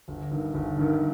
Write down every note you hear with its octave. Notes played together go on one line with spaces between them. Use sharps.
G1
G2 D#3
G1
G2 D#3